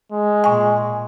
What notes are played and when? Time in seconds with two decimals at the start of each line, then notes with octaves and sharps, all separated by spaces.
0.12 G#3
0.44 A#2 G#5 C#6